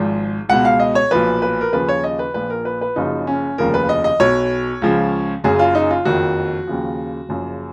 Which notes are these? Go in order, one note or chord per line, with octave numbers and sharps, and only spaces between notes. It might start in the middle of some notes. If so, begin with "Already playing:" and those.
Already playing: G#1 G#2 F3
C#2 B2 F#5
F5
D#5
C#5
B1 A#2 F3 B4
B4
A#4
D#2 C#3 F3 B4
C#5
D#5
B4
A#1 A#2 F3 B4
A#4
B4
B4
F#1 F#2 C#3 F3 D#4
C#4
F1 D#2 C#3 F3 A#4
B4
D#5
D#5
B1 B2 C#5
C#2 C#3 F3
F#1 F#2 C#3 G#4
F4
D#4
F4
F#1 F2 D#3 F#4
D#2 C#3 F3
F#1 F#2 C#3 F3